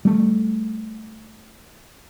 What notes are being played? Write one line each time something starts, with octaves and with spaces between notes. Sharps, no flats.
G3 A3